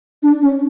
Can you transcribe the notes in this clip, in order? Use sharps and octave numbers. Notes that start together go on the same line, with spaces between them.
D4
C#4